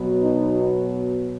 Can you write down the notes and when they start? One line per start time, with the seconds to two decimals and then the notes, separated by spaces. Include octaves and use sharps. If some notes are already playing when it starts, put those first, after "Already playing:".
Already playing: B2 F#3 B3
0.22 D#4